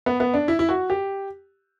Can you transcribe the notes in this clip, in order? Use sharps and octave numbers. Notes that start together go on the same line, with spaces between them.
B3
B3
D4
E4
E4
F#4
G4